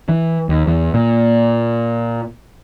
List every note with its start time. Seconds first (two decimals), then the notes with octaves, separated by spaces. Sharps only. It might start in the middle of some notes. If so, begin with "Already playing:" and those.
0.09 E3
0.49 D#2
0.67 E2
0.94 A#2